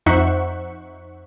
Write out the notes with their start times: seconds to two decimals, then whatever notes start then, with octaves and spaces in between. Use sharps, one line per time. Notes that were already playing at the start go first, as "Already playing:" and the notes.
0.06 F2 D#4 C5 E5 F#5 C#6